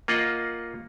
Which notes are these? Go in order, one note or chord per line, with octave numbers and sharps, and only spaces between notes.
A#3 F4 D#5 F#5